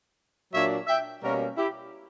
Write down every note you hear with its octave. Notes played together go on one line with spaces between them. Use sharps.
A#2 F#3 A#3 D4 C#5 E5
E5 G5
B2 G3 A#3 C#4 F#4 A#4
E4 G4